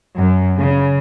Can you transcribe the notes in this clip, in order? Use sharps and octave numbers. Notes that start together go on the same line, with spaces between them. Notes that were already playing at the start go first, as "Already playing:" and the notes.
F#2
C#3